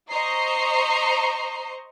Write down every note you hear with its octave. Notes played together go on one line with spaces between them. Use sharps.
C5 D#5 A#5 C#6 C7